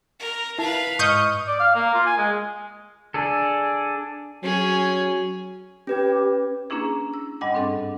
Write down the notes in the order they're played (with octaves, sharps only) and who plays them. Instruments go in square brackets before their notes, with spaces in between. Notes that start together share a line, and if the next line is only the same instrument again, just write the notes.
[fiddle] A#4
[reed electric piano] E4 A5 [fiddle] B4 F5
[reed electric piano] G#2 D#5 F6 [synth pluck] C#6 D#6 G6
[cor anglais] D5
F5
A#3
F4
G#5
G#3
[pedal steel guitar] D4 G#4 A4
[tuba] F#3 [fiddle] C#4 G#4
[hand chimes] C#4 B4 G#6 [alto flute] G4
[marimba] A#3 C#4 D4 E4 G#4
E6
G2 G3 D#5 F#5 D6
G#2 C4 D4 A4